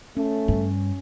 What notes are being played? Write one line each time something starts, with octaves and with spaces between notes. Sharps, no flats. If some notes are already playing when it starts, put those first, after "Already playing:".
A3 C#4
G2